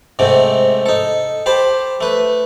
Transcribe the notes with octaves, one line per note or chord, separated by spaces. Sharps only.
G#2 C3 A3 C4
D#4 A4
G4 C5 A5 B5
A3 B4